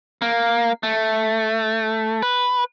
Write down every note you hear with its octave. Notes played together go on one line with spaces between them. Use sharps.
A#3
A3
B4